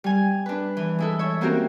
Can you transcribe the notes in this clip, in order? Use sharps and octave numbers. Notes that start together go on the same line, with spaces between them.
G3 G#5
D4 B4
E3
G#3 E4 A4
C#5 E5
A#3 C4 C#4 F#4 G4 A#4